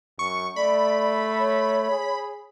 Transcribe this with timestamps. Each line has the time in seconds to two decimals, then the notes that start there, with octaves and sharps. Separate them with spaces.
0.19 F#2 C#6
0.56 A3 D5 B5
1.39 C#5
1.91 G#4